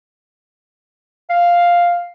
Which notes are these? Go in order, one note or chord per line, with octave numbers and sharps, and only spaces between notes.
F5